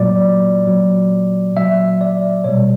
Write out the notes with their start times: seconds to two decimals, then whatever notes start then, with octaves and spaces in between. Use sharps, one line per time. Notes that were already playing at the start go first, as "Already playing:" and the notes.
Already playing: A#2 F#3 D5
0.67 A#2 F#3
1.56 A#2 F#3 E5
2.01 D5
2.44 B2 G3 C#5